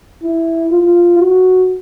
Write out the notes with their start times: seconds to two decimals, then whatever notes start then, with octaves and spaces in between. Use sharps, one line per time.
0.24 E4
0.72 F4
1.20 F#4